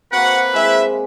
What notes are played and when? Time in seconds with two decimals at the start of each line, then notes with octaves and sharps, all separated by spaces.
0.12 A#3 C4 F#4 B4 F#5
0.54 G#3 C4 E4 E5